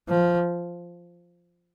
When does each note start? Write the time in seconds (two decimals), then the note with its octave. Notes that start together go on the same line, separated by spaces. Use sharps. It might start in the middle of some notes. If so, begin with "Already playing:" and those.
0.09 F3